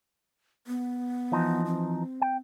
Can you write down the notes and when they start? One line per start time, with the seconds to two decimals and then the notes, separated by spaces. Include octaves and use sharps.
0.67 B3
1.32 E3 F3 D#4
1.66 C4
2.22 G5